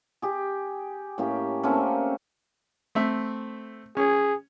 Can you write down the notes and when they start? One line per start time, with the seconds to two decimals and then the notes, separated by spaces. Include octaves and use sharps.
0.22 G4 G#4
1.18 A2 A#3 C#4 G4
1.63 A3 A#3 C4 C#4
2.95 A3 C4 E5
3.97 C#4 G#4